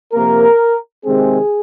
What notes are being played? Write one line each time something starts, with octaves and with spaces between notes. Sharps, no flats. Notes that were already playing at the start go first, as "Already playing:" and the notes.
C3 F3 A#3 A#4
C3 D#3 G#3 C4 G#4